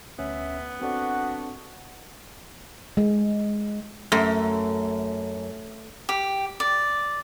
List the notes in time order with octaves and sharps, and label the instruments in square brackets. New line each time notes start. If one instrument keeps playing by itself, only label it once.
[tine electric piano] D2 C#4 [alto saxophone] B3 [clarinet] E5
[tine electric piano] C4 A4 D5 [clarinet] D4 [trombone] F#4
[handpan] G#3
[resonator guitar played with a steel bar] F#2 [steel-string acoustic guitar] A3
[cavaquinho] G4
D5